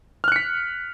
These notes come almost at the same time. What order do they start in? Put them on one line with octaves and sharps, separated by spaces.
F6 F#6 C#7 B6